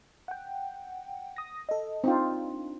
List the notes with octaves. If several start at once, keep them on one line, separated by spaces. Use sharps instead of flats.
F#5 G5
D#6 A#6
A4 D#5
C4 D4 D#4 F4